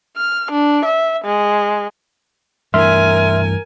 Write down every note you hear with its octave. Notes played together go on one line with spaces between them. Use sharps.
F6
D4
E5
G#3
G2 E3 A3 A#4 E5 G#5 C6 F6